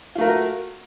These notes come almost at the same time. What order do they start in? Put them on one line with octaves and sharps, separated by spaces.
F4 A3 A#4 F#4